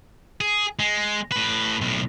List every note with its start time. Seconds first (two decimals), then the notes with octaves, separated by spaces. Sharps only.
0.41 G#4
0.79 G#3
1.32 A2 B4
1.81 B1 A2